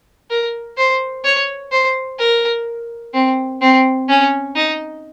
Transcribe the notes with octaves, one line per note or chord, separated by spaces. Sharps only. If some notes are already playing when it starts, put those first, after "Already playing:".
A#4
C5
C#5
C5
A#4
C4
C4
C#4
D#4